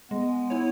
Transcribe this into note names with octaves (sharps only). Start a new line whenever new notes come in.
G#3 B3
E4 C#5